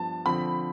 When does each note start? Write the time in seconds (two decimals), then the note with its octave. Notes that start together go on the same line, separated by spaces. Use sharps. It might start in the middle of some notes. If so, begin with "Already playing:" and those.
Already playing: G2 F3 B3 D4 A5
0.26 D3 F3 C4 B5